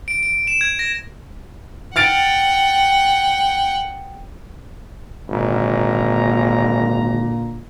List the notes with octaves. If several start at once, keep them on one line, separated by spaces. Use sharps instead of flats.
D7
D7
E7
G#6
A#6
F#5 G5 F6 A6 D7
G#1 A#2 D3 A#5